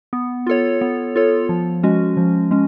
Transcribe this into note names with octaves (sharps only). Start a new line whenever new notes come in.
B3
F4 A4 C#5
B3
F4 A4 C#5
F3
G#3 C#4 F#4
F3
G#3 C#4